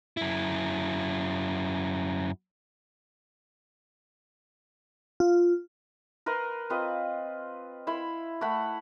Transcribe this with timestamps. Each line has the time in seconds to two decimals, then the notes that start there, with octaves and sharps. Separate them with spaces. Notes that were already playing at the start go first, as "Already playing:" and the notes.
0.17 F#2 E4
5.20 F4
6.26 A#4 B4 A#5 C6
6.70 C4 F4 B4 D#5
7.87 E4 E5 B5 C6
8.41 A3 E4 F#5 B5